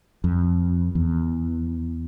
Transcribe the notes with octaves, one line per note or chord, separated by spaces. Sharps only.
F2
E2